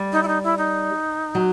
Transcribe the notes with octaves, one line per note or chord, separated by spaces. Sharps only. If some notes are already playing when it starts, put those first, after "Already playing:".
Already playing: G3
D#4
E4
D#4
E4
D#4
F#3